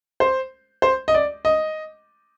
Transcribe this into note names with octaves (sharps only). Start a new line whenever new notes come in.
C5
C5
D#5
D5
D#5